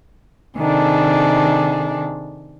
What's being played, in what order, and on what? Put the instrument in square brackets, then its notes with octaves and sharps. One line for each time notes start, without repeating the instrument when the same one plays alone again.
[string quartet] C3 D#3 D4 G#4 A4